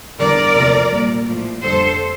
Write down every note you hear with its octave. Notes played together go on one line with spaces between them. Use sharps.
E2 D3 G3 A#4 D5
D2 C3 F3 A3
A#2 G3
A2 F3 A3
F2 D3 G3 A4 C5